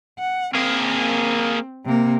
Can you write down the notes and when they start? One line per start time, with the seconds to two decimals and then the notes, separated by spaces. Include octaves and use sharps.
0.19 F#5
0.55 A#3 C4 G#4
1.85 C3 A#3